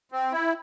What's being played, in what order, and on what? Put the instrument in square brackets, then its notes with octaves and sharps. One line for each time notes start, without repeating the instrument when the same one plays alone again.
[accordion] C4
E4